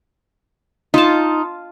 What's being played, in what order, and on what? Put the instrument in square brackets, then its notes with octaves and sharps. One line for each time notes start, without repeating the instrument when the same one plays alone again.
[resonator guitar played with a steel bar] D#4 [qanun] F4 A5